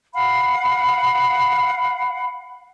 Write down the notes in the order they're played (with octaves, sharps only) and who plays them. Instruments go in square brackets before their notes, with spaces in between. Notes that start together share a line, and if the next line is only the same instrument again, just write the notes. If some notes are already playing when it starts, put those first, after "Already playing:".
[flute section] F5 F#5 B5